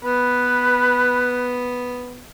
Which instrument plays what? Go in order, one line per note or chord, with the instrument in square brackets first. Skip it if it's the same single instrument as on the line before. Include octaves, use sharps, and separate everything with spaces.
[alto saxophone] B3 [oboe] B4